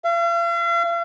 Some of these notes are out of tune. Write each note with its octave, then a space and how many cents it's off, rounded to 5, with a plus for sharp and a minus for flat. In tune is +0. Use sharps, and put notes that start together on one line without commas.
F5 -45